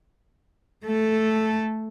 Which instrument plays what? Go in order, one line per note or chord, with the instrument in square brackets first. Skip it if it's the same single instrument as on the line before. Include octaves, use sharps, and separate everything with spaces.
[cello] A3 A4